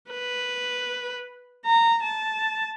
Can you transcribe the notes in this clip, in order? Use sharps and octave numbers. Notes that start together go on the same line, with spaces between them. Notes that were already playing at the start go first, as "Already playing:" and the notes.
B4
A#5
A5